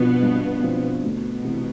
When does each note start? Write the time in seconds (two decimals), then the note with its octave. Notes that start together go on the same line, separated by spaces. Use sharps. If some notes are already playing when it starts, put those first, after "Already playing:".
Already playing: G2 B2 F3 B3 C4 F4
0.22 G2
0.62 F3 C4 F4
1.03 D2 B2 B3
1.45 C3 E3